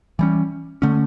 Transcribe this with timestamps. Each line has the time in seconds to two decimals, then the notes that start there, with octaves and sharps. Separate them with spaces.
0.19 E3 G3 C#4
0.82 D3 A3 C#4